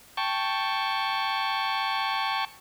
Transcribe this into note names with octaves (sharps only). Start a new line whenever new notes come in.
G5 A5 C#6